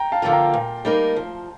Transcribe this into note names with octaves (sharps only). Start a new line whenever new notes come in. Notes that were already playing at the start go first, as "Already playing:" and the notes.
Already playing: G5 A#5
F5 A5
D3 F3 A#3 F4
G5 A#5
A#2
G3 A#3 D#4 A#4
F3